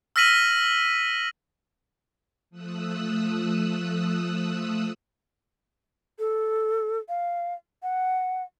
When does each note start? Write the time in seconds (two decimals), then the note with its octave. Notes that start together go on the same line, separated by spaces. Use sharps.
0.16 E6 F6 A#6 B6 D#7 F#7
2.50 F3 A3 D#6 E6 F#6
6.19 A4
7.09 F5
7.83 F#5